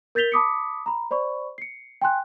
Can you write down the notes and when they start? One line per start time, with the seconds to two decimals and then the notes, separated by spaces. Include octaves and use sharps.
0.15 A#4 G6 A6 B6 F7 G7
0.32 A5 B5 D6 D#6 B6 C#7
0.86 A#5 B5
1.11 C5 D5 B5 C#6
1.58 C7 C#7
2.02 G5 G#5 C6 F#6